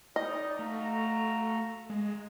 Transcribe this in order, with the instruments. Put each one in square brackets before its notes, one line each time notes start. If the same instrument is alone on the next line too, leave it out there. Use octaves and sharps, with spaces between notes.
[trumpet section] D#4 D5 [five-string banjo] D#5
[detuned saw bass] A3 [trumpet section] F#4 F5 A#5
[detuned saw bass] G#3